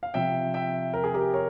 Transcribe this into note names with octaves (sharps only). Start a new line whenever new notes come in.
F5
C3 F3 E5 G5
E5 G5
A#4
G#4
G4 A#4
A#4 C#5